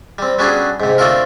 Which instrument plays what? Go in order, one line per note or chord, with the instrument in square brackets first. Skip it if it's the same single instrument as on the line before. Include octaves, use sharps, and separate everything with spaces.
[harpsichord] G3 C4
F#3 G3 B3 C#4 D4 G#4
G#2 C3
A3 C4 D4 F4 A4 A#4